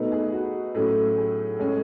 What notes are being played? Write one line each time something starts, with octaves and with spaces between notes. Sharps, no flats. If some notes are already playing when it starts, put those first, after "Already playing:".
Already playing: B2 A3 D#4 B4
G#4
F#4
A2 F#3 A3 C#4
G#4
A2 G#3 C#4